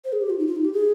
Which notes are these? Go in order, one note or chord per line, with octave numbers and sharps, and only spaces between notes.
C5
G#4
G4
F4
D#4
F4
D#4
G4
G#4